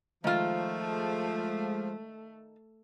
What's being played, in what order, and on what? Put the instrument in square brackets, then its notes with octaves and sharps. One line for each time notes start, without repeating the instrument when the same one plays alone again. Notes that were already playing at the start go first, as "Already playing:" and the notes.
[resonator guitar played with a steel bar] D#3 F4 [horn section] F3 [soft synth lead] G#3 [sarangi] A3